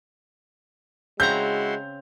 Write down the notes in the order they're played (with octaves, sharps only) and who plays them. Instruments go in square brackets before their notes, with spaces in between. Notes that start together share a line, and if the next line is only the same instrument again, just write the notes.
[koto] C#3 C4 A#5 [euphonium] G#3 [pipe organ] E4 F#4 C6 [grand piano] G6